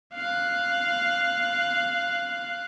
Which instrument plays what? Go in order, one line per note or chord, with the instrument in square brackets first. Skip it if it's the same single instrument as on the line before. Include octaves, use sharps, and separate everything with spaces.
[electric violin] F5 F#6